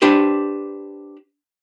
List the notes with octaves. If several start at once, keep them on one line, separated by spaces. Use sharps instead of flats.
D4 G4 B4 C5